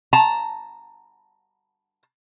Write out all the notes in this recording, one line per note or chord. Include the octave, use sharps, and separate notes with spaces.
A5 A#5